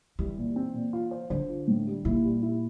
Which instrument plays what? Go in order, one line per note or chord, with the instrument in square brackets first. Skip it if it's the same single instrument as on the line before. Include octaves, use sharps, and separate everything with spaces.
[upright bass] E3 [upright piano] G3
[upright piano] A#2
C4
A#2
F4
C5
[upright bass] D3 [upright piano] C5
[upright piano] F4
A2
G3
[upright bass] A#2 [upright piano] E4
[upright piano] G3
E4